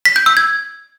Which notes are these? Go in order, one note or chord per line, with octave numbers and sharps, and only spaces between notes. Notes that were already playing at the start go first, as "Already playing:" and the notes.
B6
G6
E6
G#6